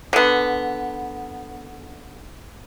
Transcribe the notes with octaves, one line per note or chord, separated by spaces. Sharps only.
D3 B3